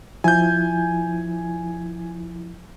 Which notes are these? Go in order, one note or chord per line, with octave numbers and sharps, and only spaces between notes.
F3 E4 G#5 G6